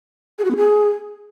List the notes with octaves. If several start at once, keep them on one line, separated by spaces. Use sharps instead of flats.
G#4
F#4
B3
G#4